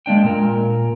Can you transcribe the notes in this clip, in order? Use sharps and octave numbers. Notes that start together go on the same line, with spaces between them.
G#3 A#3 D4 G5
A#2 A#4